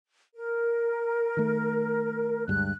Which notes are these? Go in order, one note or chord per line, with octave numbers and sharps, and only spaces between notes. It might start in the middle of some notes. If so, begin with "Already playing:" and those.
A#4
D#3 A3
D2 G2 G#3 F#6